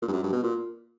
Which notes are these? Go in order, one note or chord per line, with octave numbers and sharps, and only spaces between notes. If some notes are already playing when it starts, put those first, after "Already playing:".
A#2
G2
F#2
G2
B2
A#2